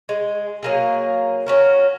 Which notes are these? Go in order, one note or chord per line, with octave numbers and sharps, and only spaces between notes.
G#3
F#3 A#3 G#4
C#4 F#4 A#4